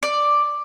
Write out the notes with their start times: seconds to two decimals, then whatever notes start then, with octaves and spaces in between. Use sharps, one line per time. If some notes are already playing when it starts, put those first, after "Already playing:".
0.03 D5